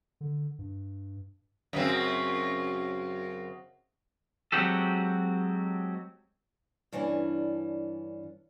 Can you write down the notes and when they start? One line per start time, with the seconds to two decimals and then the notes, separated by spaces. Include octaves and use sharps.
0.21 D3
0.59 G2
1.73 F#2 C#3 C4
4.52 F#3 G#3 C4 F#4 G4 A4
6.92 G2 E3 C#4 D4